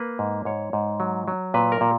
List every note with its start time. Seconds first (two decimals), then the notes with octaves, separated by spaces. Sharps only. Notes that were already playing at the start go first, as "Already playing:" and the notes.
Already playing: A#3 B4
0.19 G#2
0.45 G#2 C#5
0.73 G#2
1.00 F#3
1.28 F#3
1.54 A#2 B4
1.72 A#4
1.81 A#2